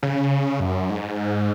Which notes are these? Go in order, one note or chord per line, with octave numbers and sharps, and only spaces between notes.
C#3
F#2
G#2